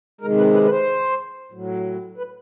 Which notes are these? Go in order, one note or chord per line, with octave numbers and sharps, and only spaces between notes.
C3 D#3 G#3 A#4
B4
B4
B4
C5
A2 F#3
B4